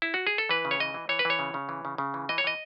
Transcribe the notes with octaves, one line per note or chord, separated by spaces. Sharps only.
E4
F#4
G#4
A4
E3 B4
C#3
C#5
E3 D#5
E3
E3 C#5
B4
E3 C#5
C#3
C#3
E3
C#3
C#3
E3
E3 D#5
C#5
E3 D#5